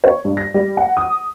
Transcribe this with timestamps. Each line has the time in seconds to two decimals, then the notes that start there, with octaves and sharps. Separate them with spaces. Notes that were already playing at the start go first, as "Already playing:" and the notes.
0.04 C#5
0.25 G2
0.37 A#6
0.54 G3
0.77 F#5
0.97 D#6